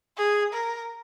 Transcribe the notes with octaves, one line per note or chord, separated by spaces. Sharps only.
G#4
A#4